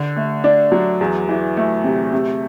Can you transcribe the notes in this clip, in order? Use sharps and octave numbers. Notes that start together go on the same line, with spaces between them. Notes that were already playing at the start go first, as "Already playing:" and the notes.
Already playing: D3
A3
D4
F#3
E2
E3
A3
C3
C3